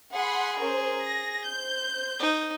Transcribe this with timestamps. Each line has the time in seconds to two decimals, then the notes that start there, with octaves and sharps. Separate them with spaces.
0.13 G#4 F#5 B5 C6
0.60 C#4 A#4 C5
1.01 A#6
1.46 C5 G6
2.20 D#4